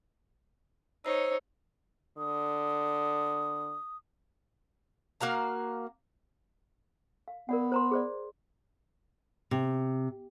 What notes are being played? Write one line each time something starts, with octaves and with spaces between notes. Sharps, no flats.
D#4 C5 C#5 E6
D3 D#6
A#3 F#4 F5 A#5
F5
B3 A#4 D5 F#5
C5 A#5 C6
G#4 C5 D5
C3